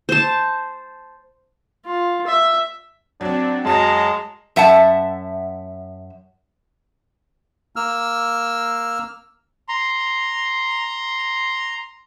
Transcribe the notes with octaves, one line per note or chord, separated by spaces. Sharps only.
C5 A5
F4
E5
F#3 C4 D4
F#2 F#3 G#3 A5 A#5 A#6
F#2 E5 F#5 A5
A#3 E6 F6
A#5 C6